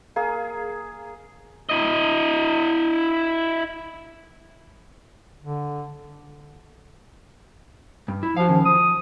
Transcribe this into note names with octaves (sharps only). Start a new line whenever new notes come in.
A#3 G#4
E4 D#5
D3
G2
E4
F3 F#4 F5
D#3 C#4
F3 D#6